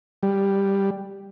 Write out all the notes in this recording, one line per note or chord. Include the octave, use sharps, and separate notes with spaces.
G3